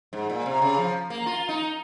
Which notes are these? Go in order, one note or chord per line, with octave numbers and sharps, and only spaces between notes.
G#2
A#2
C3
C#3
F3
A#3
F4
D#4